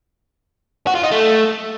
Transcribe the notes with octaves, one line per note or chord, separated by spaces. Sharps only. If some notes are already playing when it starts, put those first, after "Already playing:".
F#4
F4
D#4
A3